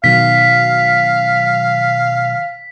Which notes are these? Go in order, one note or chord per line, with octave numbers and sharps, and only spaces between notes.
B2 D#3 F#3 F5 B6